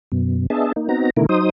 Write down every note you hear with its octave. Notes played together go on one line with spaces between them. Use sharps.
F#2 B2
B3 D4 G#4 D#5 E5 A5
A#3 D#4
B3 C4 D#4 F#4 A#5
B2 D3 D#3 A3 E4 A#4
F#3 D#4 C5 D#6